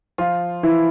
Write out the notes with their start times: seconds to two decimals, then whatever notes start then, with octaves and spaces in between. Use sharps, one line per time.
0.18 F3 F4
0.63 E3 E4